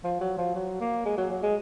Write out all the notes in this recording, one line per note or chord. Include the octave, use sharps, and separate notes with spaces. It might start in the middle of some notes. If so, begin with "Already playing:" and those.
F3
F#3
F3
F#3
A#3
G#3
F#3
F#3
G#3